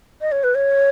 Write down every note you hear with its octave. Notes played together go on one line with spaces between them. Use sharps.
D#5
C#5
B4
C#5